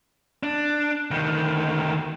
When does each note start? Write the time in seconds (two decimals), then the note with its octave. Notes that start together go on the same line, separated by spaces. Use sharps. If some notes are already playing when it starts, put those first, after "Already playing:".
0.43 D4
1.11 D2 D#3